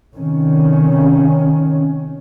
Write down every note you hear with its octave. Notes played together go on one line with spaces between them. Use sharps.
C3 D#3 C#4